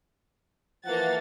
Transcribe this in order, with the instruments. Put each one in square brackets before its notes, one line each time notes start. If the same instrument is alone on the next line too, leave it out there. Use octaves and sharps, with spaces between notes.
[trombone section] E3 F3 [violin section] A#3 A4 A6 [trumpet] F#5